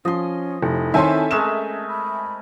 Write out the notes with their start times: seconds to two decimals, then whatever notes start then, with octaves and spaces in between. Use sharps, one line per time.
0.05 F3 C#4 D#5 C6
0.63 F1 E4
0.94 D#3 C4 A4 C#5 E5 G#5 A5 C6
1.31 G#3 A3 C#4 A#4 E7
1.88 B5